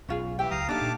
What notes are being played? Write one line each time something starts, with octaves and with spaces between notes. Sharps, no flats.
B1 C#4 F4 G#4
E3 G4 E5 G5
C#2 F#3 F5 A#5 D#6
A3 A#3 D4 D#4 G4 F5 A5 D6
A#2